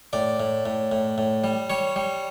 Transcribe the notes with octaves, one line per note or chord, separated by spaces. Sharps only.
A2 D5
A2
A2
A2
A2
G3
G3 C#5
G3